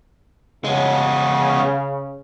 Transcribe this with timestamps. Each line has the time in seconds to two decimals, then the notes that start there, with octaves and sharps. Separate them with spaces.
0.64 C#3 G#3 B3